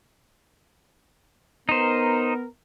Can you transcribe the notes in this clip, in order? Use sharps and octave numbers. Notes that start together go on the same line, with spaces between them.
B3 D#4 A#4 C5